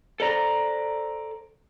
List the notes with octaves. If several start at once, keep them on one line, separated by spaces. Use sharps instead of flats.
A4 C5 D5 A#5